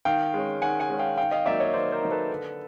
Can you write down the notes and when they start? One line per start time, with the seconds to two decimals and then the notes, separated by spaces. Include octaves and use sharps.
0.05 D#3 F5 G5
0.34 G#3 C#4
0.62 D#3 F#5 G#5
0.80 F#5 G#5
0.90 G#3 C#4
0.99 F5 G5
1.18 D#3 F5 G5
1.31 D#5 F5
1.45 F#3 A#3 D#4 D5 E5
1.60 C#5 D#5
1.74 D#3 C5 D5
1.92 A#4 C5
2.02 F#3 A#3 D#4
2.11 A4 B4
2.30 D3